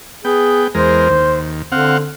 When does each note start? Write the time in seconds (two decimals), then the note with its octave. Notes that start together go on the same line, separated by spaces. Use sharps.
0.25 B3 G#4 G5
0.75 E2 G#3 A#4 C5
1.10 D#2
1.72 D3 C4 F5 F#5